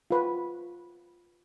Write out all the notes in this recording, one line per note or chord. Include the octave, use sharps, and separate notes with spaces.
F4 B4